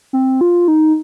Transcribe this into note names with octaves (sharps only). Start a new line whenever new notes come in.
C4
F4
D#4